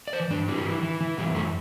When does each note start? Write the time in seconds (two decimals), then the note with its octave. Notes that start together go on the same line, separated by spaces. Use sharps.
0.08 D5
0.13 E3 C5
0.30 G2 D4
0.48 E3 G3
0.65 E3
0.83 E3
1.01 E3
1.17 F#2 G3
1.35 F#2 A3